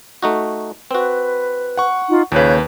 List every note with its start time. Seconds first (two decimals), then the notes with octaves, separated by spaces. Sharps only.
0.23 A3 D#4 F#4
0.91 C4 F#4 B4
1.77 F#5 C#6
2.08 D#4 F4
2.32 D#2 A#2 C#3 B4 C#5 F#6 G6